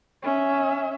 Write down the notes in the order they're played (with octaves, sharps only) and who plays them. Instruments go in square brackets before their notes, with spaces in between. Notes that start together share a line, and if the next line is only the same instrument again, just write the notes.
[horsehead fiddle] C#4 E5